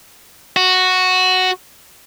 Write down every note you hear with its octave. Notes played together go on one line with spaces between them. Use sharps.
F#4